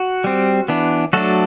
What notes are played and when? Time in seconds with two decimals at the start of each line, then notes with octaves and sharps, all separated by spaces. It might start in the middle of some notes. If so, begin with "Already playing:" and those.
Already playing: F#4
0.24 G3 C4
0.68 E3 B3 D4
1.13 F#3 A3 D4 F#4 A4